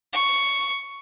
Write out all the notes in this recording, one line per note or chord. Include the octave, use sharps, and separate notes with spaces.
C#6